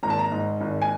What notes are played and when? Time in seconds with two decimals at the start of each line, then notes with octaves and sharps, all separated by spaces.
0.03 G#1 A#5
0.10 A5
0.19 A#5
0.31 G#2
0.61 G#1
0.82 G#5